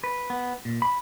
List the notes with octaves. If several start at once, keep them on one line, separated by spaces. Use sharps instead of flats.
B4
B3
A#2
B5